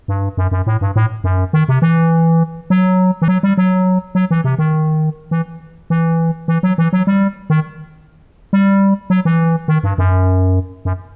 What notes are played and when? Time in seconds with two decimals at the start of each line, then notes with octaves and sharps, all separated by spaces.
0.08 G2
0.37 F#2
0.51 F#2
0.67 A2
0.81 G2
0.96 A2
1.24 F#2
1.53 D#3
1.69 C3
1.82 E3
2.70 F#3
3.22 E3
3.28 F#3
3.43 G3
3.58 F#3
4.15 F#3
4.31 E3
4.44 C3
4.59 D#3
5.31 E3
5.90 E3
6.48 E3
6.63 F#3
6.78 E3
6.93 F#3
7.07 G3
7.50 D#3
8.53 G3
9.10 F#3
9.25 E3
9.68 D#3
9.83 G2
9.98 F#2
10.85 F#2